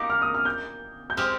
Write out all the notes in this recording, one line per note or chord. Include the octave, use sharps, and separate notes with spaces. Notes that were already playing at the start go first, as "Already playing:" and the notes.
Already playing: A#3 D#4 G4 A#4 D6
F6
D#6
F6
G6
G6
G#3 C4 G4 F6